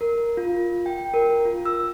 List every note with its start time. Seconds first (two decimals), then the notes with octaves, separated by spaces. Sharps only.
0.01 A#4
0.37 F4
0.86 G5
1.14 A#4
1.45 F4
1.66 E6